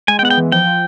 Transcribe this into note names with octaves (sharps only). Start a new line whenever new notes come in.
G#3 G#5
G5
B3 F#5
G5
E3
F3 G5
F3